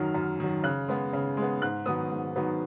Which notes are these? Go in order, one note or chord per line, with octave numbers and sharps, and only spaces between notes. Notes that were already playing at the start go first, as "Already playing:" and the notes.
Already playing: F#2 D#3 F#3 F6
F#2
D#3 F#3
C#3 F#6
G#3 B3
C#3
G#3
B3
G#2 F#6
D#3 F#3 B3 D#6
G#2
D#3 F#3 B3